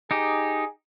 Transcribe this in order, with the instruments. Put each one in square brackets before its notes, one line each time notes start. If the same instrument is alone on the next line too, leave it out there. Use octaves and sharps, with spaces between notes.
[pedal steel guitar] D#4 G4 [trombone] G#4